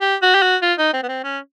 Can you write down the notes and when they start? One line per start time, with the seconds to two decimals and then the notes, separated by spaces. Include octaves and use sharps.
0.01 G4
0.22 F#4
0.35 G4
0.42 F#4
0.62 F4
0.78 D#4
0.93 C4
1.03 B3
1.09 C4
1.24 C#4